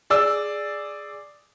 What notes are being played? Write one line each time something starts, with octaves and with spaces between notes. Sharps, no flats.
G#4 D5 E6